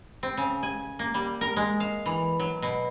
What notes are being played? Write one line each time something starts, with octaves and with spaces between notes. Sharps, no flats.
C4
C#3
G#5
A#3
G3
A#4
G#3
F5
E3
F#3
B2